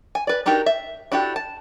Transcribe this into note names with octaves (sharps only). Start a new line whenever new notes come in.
G#5
B4 D5
D4 D#4 F#4 G4 A#4
E5
D4 E4 F#4 G4 A4
A5